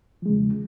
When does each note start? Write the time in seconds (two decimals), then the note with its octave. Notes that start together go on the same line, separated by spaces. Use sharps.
0.22 F3
0.26 G#3
0.29 C#3
0.32 E2